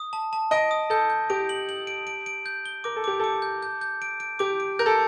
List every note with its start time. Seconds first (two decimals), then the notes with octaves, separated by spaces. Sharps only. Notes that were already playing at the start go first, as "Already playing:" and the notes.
Already playing: D#6
0.13 A5
0.33 A5
0.51 D#5 D7
0.71 D#6
0.90 A4 G6
1.10 G6
1.30 G4 D7
1.49 F#7
1.69 F#7
1.87 D7
2.07 D7
2.26 D7
2.46 G6
2.66 G7
2.84 A#4 D6
2.96 A4
3.04 G4 D6
3.20 A4 D6
3.42 G6
3.62 G6
3.81 G6
4.02 D7
4.20 D7
4.39 G4 D6
4.60 D7
4.79 A#4 G6
4.86 A4